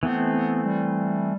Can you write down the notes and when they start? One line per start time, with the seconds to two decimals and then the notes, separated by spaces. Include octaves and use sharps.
0.03 E3 A3 B3 C4
0.34 B3
0.65 G3